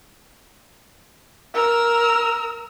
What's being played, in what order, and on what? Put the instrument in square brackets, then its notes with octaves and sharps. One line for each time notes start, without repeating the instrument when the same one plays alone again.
[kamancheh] A#4 E6